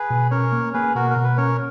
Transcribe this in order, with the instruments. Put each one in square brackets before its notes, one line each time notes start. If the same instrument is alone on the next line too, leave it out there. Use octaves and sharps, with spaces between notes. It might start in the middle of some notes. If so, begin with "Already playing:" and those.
Already playing: [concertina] G#4 B4
[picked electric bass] B2
[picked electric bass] C#4 [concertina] A#4 C#5
[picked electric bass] A#3
[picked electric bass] A#3 [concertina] G#4 B4
[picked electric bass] B2 [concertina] F#4 A#4
[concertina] A#4
[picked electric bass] B2
[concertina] B4
[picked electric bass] C#4 [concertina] A#4 C#5